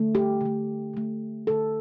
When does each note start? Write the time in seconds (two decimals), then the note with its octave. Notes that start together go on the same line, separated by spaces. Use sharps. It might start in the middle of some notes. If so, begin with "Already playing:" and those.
Already playing: D3 A3
0.15 G4
0.41 D3 A3
0.94 D3 A3
1.47 D3 A3 A4